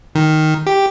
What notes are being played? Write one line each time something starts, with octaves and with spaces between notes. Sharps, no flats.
D#3
G4